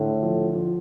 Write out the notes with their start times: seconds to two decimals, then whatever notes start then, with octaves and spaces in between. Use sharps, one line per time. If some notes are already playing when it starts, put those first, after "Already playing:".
Already playing: A2 D3
0.23 F3
0.55 F3